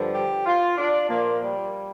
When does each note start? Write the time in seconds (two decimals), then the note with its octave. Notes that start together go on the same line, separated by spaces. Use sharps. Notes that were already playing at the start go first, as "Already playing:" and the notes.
Already playing: G2 D3 F3
0.13 G4
0.46 F4
0.77 D4
1.08 A#2 F3 A#3
1.41 G3